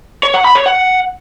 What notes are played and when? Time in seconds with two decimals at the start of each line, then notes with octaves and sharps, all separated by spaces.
0.23 C#5
0.34 F#5
0.45 B5
0.55 C#5
0.66 F#5